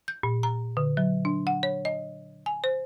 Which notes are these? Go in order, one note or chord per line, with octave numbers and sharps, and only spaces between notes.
G6
A#2
A#5
D3
F#3
D4
F#5
C#5
D#5
G#5
C5